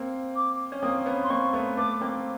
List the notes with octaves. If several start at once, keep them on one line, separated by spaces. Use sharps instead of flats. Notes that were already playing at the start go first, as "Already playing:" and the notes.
Already playing: A#3 C4
D6
C#4
A#3 C4 D#6
B3 C#4
C6
A#3 C4 C#6
A3 B3
A3 B3 D6
A#3 C4